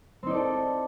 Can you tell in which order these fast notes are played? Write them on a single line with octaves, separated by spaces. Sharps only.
C4 D#4 D5 A4